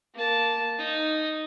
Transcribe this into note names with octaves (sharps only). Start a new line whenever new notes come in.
A#3 A5
D#4